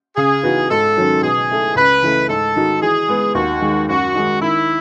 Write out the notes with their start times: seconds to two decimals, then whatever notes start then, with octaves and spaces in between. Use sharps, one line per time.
0.16 C#3 G#4
0.43 E3 B3 D#4 F#4
0.70 G#2 A4
0.97 D#3 F#3 C#4 F#4
1.23 B2 G#4
1.50 A3 E4 A4
1.75 C#2 B4
2.02 C#3 E3 A3
2.29 G#2 A4
2.55 D#3 G#3 D#4 F#4
2.81 E3 G#4
3.08 G#3 B3
3.35 D#2 F#4
3.61 D#3 G#3
3.88 F#2 F#4
4.15 D#3 G#3 D#4
4.41 D#3 E4